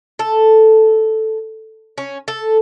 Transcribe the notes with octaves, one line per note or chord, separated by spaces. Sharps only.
A4
C#4
A4